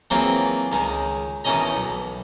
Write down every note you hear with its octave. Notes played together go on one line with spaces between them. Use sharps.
E3 F#3 A#3 C4 F4 G#4
C#2 D#3 G#4
B2 D#3 E3 C#4 D#5 A#5
B1